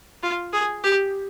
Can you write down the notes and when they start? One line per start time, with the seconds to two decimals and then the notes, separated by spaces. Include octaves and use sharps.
0.23 F4
0.53 G#4
0.84 G4